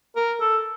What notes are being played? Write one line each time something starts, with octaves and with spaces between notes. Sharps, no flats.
A#4
A4